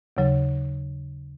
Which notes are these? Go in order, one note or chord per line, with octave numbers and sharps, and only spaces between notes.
D#2 C#3 F#3